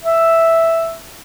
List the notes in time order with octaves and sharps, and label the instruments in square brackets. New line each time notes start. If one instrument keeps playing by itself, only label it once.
[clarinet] E5